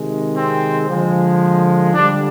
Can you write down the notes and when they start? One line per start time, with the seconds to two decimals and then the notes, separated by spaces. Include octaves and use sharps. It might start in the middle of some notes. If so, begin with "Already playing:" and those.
Already playing: C3 D#3 G#3
0.37 C4
0.89 D3 F3 G#3
1.94 D3 G3 D4